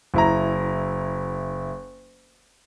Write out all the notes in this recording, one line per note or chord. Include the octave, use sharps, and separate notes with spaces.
F#1 E4 A#5